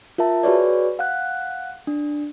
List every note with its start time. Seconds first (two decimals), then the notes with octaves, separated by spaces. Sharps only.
0.18 F4 A#4 E5 A5
0.43 F#4 G#4 B4 C#5 D5
0.99 F5 F#5 F#6
1.87 D4